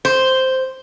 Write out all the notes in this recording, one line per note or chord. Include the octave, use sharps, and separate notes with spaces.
C5